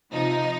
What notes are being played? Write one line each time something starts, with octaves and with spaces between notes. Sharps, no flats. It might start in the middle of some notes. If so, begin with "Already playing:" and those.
C3 F3 D#4